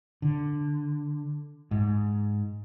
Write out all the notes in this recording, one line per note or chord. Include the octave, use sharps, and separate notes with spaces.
D3
G#2